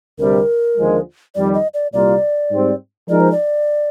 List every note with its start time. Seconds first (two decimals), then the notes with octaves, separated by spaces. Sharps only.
0.18 D2 C3 G3 A#4
0.77 D#2 D3 F3 G#3
1.35 F2 D#3 G3 D5
1.54 D#5
1.74 D5
1.93 C2 A#2 G3 A#3 F4 D5
2.51 G#2 G3 C4
3.09 F3 G#3 D#4 A#4 D5
3.20 C5
3.32 D5